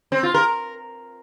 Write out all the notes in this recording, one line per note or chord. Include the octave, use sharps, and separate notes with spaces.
C4
F4
A#4